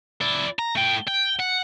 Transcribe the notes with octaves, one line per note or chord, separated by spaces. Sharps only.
E4 D5
A#5
A3 G5
G5
F#5